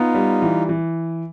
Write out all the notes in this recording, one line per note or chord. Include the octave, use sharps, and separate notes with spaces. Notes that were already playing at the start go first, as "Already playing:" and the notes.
Already playing: B3 D#4 F4
G3
E3
E3